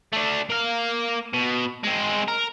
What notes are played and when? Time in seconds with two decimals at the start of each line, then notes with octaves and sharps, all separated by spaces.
0.13 A3 D4
0.50 A#3 F5
1.34 B2
1.83 G#3 C4
2.28 A#4